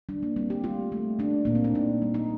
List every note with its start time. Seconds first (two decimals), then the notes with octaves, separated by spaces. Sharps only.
0.09 G3 D4
0.23 A#3
0.36 G3 C4
0.50 G4
0.64 A3 F4
0.92 A3
1.19 A3 D4
1.45 A#2 A#3
1.55 C4
1.64 D4
1.75 A#2 D#4
2.02 G3
2.14 D#4